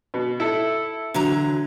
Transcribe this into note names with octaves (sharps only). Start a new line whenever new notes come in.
B2
E4 A4
D3 E3 F#3 A#5